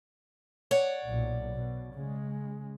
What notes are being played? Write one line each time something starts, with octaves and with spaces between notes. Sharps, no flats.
C#5 D5 F#5
B1 A#2
B2
C#3 G#3